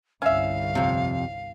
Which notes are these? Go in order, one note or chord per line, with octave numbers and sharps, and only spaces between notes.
G1 C2 C#4 E5 F5
F2 C3